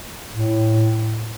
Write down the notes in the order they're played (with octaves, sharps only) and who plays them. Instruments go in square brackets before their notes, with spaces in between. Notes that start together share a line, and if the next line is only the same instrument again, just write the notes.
[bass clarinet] A2